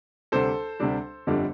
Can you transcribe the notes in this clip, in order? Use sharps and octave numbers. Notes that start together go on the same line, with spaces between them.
D2 C3 G3 D4 A4 C5
D2 C3 G3 D4
G1 F2 D3 G3 D4